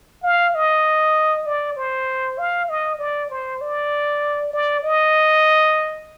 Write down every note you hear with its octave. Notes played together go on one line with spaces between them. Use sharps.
F5
D#5
D5
C5
F5
D#5
D5
C5
D5
D5
D#5